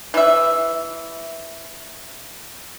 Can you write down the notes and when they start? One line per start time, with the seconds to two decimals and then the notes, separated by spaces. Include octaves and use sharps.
0.14 E3 E5